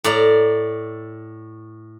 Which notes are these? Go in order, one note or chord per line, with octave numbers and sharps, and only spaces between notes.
A2 D5 A#5